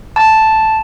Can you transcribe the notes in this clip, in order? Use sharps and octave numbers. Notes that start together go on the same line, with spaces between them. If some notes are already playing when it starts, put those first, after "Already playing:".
A5